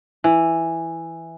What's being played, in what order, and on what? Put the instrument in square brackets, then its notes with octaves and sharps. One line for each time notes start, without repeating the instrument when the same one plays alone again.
[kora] E3